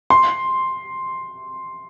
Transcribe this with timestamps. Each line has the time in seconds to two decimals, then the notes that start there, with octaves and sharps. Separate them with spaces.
0.10 C6